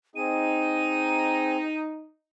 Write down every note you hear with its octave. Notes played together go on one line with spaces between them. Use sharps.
C4 D#4 G#4 D#7